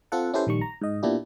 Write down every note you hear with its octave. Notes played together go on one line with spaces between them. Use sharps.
C4 F4 A4 F#5
C#4 E4 G4 A4 B4 C5
A#1 D#3 G3 C#6
A#5
G#2 D#5
A#2 A#3 B3 D4 E4 G4